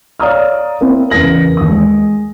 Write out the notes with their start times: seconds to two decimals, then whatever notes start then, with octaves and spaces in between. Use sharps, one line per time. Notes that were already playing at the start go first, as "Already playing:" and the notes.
0.20 C#5 D5 F5 A#5 D#6 F6
0.81 A#3 C4 E4
1.10 E2 C#3 A#4 A#6 F#7
1.57 D#2 D#6
1.69 G#3